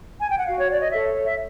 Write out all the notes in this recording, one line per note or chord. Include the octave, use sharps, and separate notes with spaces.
G#5
G5
F#5
F#4 F5
C#5
D5
D#5
A4 C#5 E5
E5